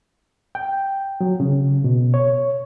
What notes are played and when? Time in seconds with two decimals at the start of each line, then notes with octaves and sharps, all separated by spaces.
0.55 G5
1.21 F#3
1.40 C#3
1.84 B2
2.14 C#5